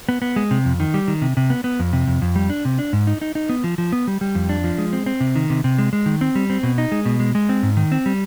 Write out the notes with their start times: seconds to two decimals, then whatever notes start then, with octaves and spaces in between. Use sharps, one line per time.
0.09 B3
0.22 B3
0.36 G#3
0.51 C3
0.65 F2
0.80 D#3
0.94 G3
1.08 D#3
1.22 C3
1.37 C3
1.50 B3
1.64 B3
1.80 F2
1.93 C3
2.07 F2
2.22 F2
2.36 G3
2.50 D4
2.65 C3
2.79 D4
2.93 G#2
3.07 D#4
3.21 D#4
3.35 D#4
3.49 B3
3.64 F3
3.78 F3
3.93 B3
4.07 G3
4.21 G3
4.35 F2
4.49 D4
4.64 F3
4.78 G#3
4.93 C4
5.06 C4
5.21 C3
5.36 D#3
5.50 C3
5.64 C3
5.78 G#3
5.93 G#3
6.06 D#3
6.21 C4
6.35 G3
6.50 C4
6.63 B2
6.78 D#4
6.92 G#3
7.05 B2
7.20 G#3
7.35 G#3
7.49 C4
7.63 G#2
7.77 D#3
7.92 C4
8.06 G3